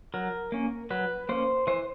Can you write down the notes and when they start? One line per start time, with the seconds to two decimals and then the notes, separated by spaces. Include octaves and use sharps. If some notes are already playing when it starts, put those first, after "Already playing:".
0.14 F#3 A#4
0.52 A#3 C#4
0.90 F#3 B4
1.29 A#3 C#4 C5
1.67 E3 C5